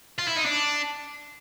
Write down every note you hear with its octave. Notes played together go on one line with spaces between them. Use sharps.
F4
E4
D#4
D4